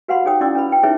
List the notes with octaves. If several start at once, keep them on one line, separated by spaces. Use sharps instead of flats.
F#4 B4 F5 F#5 B5 C6
D#4 G#4 C#5 G5 D#6
C#4 E4 D5 C6 D6 E6
C#4 B4 B5
B4 G5
D#4 E4 G#4 B4 C#5 E5